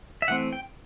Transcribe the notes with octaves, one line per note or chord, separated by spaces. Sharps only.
E5
E3 A3 C4 F#5
G5